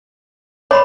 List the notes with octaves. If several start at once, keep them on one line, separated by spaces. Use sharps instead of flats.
C#5 D5 B5 C6